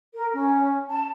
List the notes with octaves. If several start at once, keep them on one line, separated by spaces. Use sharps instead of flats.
A#4
C#4
A5